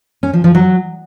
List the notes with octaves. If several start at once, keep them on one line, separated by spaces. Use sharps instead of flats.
C#4
F3
F3
F#3